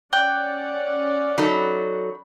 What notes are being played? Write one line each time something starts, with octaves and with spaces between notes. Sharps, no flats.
C#4 D5 F#5 G5 F#6
F#3 D#4 A4 B5